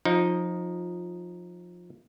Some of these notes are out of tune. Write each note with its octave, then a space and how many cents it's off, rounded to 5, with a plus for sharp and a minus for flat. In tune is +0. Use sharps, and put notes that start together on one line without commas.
F3 +20 D#4 +0